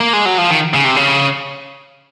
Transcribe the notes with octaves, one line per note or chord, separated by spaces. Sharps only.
A#3
G#3
F#3
F3
D#3
C#3
C3
C#3